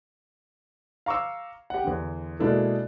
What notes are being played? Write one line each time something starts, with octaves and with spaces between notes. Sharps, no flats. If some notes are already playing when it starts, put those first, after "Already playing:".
F5 A#5 C#6 D6 E6
G4 F#5
E2 D3
B2 G#3 A#3 D4 E4 A4